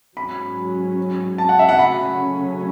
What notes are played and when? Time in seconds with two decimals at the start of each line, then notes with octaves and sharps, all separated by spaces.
0.16 G#2 F#3 C#4 B5
1.38 A5
1.49 F#5
1.59 E5
1.69 F#5
1.79 C#3 F#3 A3 C#4 B5